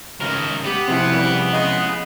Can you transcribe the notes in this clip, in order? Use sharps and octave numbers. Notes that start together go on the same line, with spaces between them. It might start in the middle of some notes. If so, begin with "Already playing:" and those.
C#2 G#3 A#4
B3 G4
E2 C3 F3 C4 E4
C#3 E3 G3
C#3 G#3 D#5